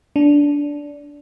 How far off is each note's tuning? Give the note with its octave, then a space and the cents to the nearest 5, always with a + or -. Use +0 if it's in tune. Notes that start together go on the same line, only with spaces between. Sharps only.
D4 -15